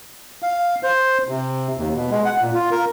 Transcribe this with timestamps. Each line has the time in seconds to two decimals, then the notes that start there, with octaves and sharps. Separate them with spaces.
0.42 F5
0.83 C5
1.29 C3
1.77 D#2
1.95 B2
2.11 G#3
2.25 F#5
2.41 A#2
2.55 F4
2.71 A#4